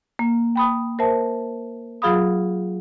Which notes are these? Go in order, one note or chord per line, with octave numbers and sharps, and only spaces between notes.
A#3
G5 B5 D#6
A#4 C5 E5 A5
F#3 F4 G#4 F5 B5 D#6